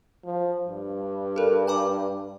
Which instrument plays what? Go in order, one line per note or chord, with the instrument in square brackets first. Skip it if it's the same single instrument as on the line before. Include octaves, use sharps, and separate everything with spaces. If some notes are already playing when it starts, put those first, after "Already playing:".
[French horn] F3
G2
[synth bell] A4 A#4
G#5 A#5 D6